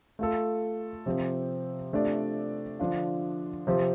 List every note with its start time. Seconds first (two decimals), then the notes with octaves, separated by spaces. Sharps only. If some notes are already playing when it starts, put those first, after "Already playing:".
0.19 A3 F4 A4
1.06 C3 F3 C4 G4
1.93 C3 A3 D4 F4 D5
2.79 D3 F3 D4 F4
3.67 C3 F3 C4